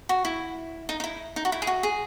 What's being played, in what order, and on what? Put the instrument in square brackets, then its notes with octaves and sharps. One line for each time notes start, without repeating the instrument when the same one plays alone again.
[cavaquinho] F#4
E4
D#4
D#4
E4
D#4
F#4
E4
G#4
F#4
G#4